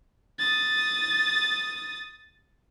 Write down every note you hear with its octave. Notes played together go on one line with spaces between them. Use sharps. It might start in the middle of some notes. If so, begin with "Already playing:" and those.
D#6 A6